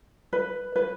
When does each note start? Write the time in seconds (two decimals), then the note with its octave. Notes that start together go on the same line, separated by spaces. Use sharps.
0.33 B4
0.76 B4